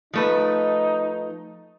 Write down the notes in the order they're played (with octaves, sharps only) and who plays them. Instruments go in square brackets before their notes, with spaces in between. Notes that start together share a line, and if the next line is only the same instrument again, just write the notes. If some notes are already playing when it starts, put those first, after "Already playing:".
[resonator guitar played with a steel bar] F3 A3 B4 [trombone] D#4